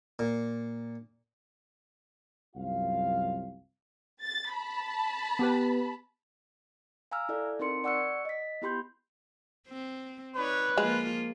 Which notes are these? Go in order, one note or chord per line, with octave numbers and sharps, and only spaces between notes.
A#2
C2 F#2 F4 F5
A6
A5 B5
B3 G4 B4
F5 G#5 A#5 E6 F6
E4 A4 D5 E5
C4 D#4 A#4 C6 C#7
D5 F#5 C#6 E6 F#6 C#7
D#5 B6
B3 E4 G4 B5 C6 G6
C4
D#4 B4 C#5 D5
F3 G#3 A#3 F4